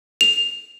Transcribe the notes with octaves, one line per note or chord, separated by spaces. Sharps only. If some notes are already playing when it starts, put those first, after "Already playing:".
F7